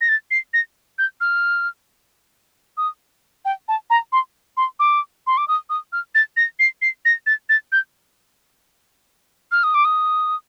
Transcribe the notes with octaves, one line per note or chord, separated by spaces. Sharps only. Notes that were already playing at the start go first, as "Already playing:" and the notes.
A#6
A6
C7
A#6
G6
F6
D#6
G5
A5
A#5
C6
C6
D6
C6
D6
D#6
D#6
F6
A6
A#6
C7
C7
A#6
A6
A6
G6
F6
D#6
D6
D#6